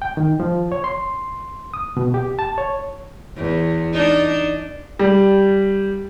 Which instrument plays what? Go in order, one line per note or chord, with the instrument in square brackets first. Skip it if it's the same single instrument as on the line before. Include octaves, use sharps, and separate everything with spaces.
[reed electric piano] G5
D#3
F3
C#5
C6
D#6
B2
G4
A5
C#5
[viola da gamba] E2
D4 D#4
[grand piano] G3